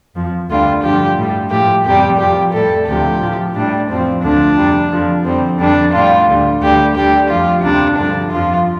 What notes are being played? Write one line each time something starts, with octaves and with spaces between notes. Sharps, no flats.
F2 F3
D2 D3 G3 F4
G2 D3 F3 G4
A2 G3
A2 F3 G4
F2 C3 G3 G4
F2 F3 G4
A2 G3 A4
D2 C3 F3 G4
A2 F3
A2 G3 D4
F2 F3 C4
D2 D3 F3 D4
F2 C3 G3
F2 D3 F3
F2 D3 G3 C4
F2 D3 G3 D4
A2 G3 F4
D2 D3 G3
D2 D3 G3 G4
D2 D3 G3 G4
F2 F3 F4
D2 C3 G3 D4
G2 D3 F3 D4
F2 F3 F4